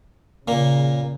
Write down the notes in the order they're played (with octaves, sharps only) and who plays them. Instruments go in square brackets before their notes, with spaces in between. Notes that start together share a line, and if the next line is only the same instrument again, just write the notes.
[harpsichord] A#2 A#3 [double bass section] C#3